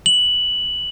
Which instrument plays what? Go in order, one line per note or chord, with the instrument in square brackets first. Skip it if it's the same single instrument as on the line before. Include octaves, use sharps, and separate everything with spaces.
[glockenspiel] F#7